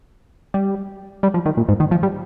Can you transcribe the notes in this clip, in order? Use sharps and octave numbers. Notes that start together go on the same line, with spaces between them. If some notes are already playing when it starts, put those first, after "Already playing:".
G3
G3
F3
D#3
A#2
G#2
D#3
F3
G3